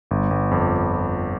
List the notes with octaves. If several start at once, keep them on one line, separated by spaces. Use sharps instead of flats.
G1
G1
F2